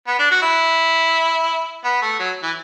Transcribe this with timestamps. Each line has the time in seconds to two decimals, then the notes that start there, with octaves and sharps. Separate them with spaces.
0.07 B3
0.19 D4
0.31 F#4
0.42 E4
1.84 B3
2.02 A3
2.19 F#3
2.43 E3